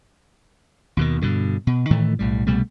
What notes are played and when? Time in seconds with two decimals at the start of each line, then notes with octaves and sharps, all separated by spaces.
0.97 D#2 B2 D#3
1.22 G2 B2 D3
1.67 B2
1.90 A2 D#3 E3 A3
2.19 B1 A2 G3
2.47 C2 B2 G3 A3